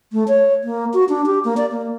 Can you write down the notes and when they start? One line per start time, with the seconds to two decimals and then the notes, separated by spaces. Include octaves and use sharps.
0.13 A3
0.28 C#5
0.64 A#3
0.94 F#4
1.09 D4
1.26 G4
1.45 A#3
1.57 D5
1.72 A#3